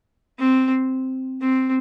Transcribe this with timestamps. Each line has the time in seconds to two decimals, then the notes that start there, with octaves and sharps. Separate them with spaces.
0.39 C4
1.41 C4